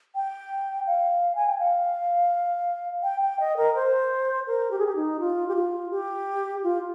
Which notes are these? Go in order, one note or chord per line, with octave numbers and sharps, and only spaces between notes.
G5
F5
G#5
G5
F5
G5
G5
D#5
A#4
C5
A#4
G4
G#4
G4
D#4
F4
G4
F4
G4
F4